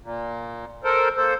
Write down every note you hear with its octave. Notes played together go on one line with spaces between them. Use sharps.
A#2
A4 A#4 C5
A#3 A4 C5